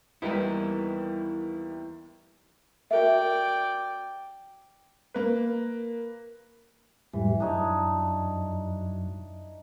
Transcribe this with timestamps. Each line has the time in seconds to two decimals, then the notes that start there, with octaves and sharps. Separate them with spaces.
0.22 D#2 E3 G3 B3 D#4 E4 A#4 B4
2.91 F#4 A#4 D5 E5 G5
5.14 A#3 B4
7.13 F2 A2 E3 G3
7.40 F#2 D4 D#4 C#5